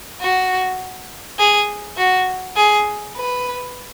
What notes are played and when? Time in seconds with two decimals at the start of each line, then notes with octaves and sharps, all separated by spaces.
0.21 F#4
1.39 G#4
1.98 F#4
2.56 G#4
3.16 B4